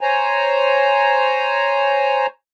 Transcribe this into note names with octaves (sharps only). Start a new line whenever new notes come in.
C5 C#5 G#5 A#5